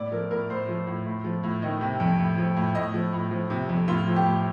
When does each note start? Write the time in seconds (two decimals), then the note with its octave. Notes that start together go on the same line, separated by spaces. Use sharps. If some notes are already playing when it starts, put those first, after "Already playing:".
Already playing: A2 D5
0.12 F3 A#4
0.31 A2 A#4
0.49 A2 C5
0.69 F3
0.87 A2
1.06 A2
1.24 F3
1.43 A2
1.62 D#3 D#5
1.81 C3
2.00 F2
2.19 A2
2.38 F3
2.56 A2
2.75 A2 D#5
2.94 F3
3.13 A2
3.31 F3
3.50 C3
3.69 F2
3.88 A2 F4
4.06 F3
4.16 G4
4.26 A2